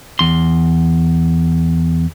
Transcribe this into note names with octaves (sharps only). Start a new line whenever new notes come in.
E2 C6